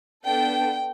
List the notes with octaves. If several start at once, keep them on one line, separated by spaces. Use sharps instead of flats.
B3 D4 A4 G5